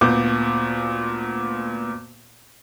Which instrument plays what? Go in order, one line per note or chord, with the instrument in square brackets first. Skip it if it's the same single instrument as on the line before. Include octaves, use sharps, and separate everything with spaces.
[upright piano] D2 A#2 B3 D6 G6